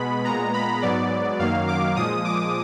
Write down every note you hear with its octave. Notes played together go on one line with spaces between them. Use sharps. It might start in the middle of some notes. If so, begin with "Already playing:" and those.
Already playing: B2 G#3 B3 B5
A#2 G#3 B3 A#5
B5
G#2 F#3 B3 D5
F#2 D#3 F#3 A#3 F5
D6
A#2 F3 G#3 D#6
D6